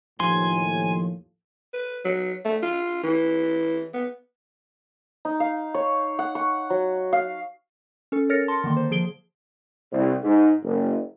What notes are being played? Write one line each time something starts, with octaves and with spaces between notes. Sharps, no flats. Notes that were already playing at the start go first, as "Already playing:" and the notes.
D#2 A2 F3 G#5 C6
B4
F#3
A3
F4
E3
B3
D#4
F5
C#5
F#5
C#6
F#3
F5
C#4 A4
A#4 C#5 F6 A6 A#6 C#7
A5 C6
D3 D#3 A#3 C6
C5
F3 G#4 D7 G7
C2
G#2
F#1